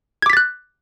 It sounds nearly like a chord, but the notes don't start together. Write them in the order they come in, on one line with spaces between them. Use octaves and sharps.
G#6 D6 B6 A6 F#6